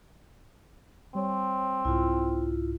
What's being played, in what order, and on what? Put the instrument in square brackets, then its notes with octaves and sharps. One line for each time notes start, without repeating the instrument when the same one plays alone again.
[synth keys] G3 C#5 [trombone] C4
[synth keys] C2 G#2 [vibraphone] E4 F4